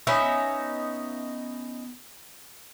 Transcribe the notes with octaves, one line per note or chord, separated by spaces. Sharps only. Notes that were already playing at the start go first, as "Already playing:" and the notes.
B3 C#4 D#4 E5